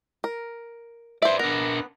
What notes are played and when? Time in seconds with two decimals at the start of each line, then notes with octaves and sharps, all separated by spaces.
0.24 A#4
1.22 B4 C5 D5 E5
1.39 B3 D4 A#4